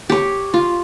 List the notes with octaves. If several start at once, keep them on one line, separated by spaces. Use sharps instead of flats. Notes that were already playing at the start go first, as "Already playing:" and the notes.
G4 C#5
F4